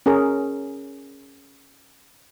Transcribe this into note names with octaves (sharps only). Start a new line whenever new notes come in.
C#4 G#4 A#4